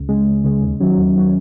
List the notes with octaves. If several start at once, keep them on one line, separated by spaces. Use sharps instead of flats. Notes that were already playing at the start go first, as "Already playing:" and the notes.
Already playing: C#2
C#3 G#3
C#2
C#3 G#3
D#2
D#3 F#3 C#4
D#2
D#3 F#3 C#4